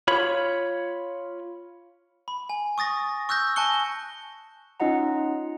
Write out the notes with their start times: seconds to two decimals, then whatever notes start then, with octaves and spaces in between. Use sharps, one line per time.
0.08 F4 C#5 B5
2.28 B5
2.50 G#5
2.78 C#6 D#6 A6 A#6
3.29 C#6 E6 F#6 G6 A#6
3.56 G#5 A5 C#6 F#6 C#7 G7
4.80 C#4 D#4 F4 D#5 F#5 A#5